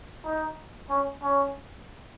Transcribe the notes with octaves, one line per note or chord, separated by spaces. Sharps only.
D#4
C#4
C#4